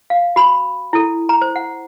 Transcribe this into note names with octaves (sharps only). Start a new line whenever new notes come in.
F5
F#4 B5
E4 A4
A#5
C5
F#5